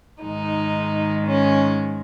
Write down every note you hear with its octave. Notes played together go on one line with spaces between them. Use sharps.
G#2 D#3 G#3 D#4
C#4